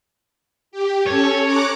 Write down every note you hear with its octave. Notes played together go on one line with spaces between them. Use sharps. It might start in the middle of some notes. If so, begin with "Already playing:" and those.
G4
C#4 A4 C#5
A#5 D6 F#6